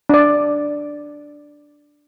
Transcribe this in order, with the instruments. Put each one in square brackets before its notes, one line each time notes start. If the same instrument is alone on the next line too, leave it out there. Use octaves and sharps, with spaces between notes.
[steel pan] D4 D5